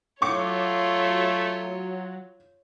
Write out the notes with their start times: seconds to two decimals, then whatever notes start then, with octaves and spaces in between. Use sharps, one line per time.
0.22 F#3 A3 F4 C#5 C#6 D6 C#7